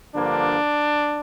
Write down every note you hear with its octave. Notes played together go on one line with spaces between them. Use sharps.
G2 D3 F3 A#3 D4